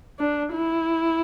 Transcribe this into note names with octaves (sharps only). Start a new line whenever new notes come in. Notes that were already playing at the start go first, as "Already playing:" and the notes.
D4
E4